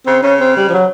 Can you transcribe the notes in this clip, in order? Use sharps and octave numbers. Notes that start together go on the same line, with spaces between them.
C#3 C4
C#3 C#4
C4
G3
F3
F#3